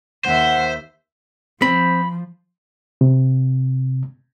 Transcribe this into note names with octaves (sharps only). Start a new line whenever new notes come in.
D#2 C5 E5 F#5
F3 C4 B5
C3